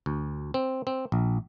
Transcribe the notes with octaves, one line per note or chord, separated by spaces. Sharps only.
D2
C4
C4
A#1